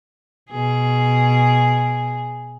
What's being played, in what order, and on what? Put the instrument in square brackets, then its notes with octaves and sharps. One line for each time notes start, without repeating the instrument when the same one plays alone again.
[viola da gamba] B2 G#4